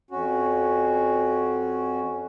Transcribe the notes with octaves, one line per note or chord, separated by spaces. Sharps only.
F2 C#4 F#4